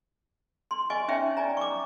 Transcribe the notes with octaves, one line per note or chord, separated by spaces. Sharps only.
C6
D#5 G#5 C#6
C#4 D#4 C#5 E5 G5
D5 D#5 G#5 A#5
C#6 D6